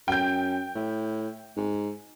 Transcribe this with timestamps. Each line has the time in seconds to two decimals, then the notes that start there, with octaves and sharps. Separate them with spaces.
0.08 F#2 G5 G6
0.75 A2
1.57 G#2